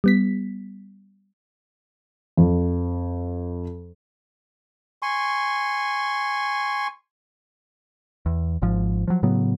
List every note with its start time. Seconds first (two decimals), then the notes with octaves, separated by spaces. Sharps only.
0.04 G3 B3 B6
2.37 F2
5.02 G#5 C6 C#6
8.26 E2
8.62 G#1 G#2 F3
9.08 F3 F#3
9.23 A2 C#3 F#3 B3